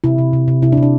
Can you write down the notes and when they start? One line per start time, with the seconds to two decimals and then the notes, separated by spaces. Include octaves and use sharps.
0.04 C3 E4
0.18 C3
0.33 C3
0.48 C3
0.62 C3 E4
0.72 D4
0.77 C3
0.83 D4